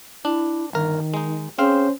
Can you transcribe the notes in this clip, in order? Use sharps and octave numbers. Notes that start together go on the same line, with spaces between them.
D4 E4
G1 D#3 A#4
G#3 D#4
C4 C#4 G#4 C5 F5